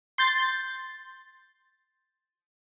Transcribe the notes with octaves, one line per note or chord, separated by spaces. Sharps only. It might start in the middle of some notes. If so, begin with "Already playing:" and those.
C6 G6 A6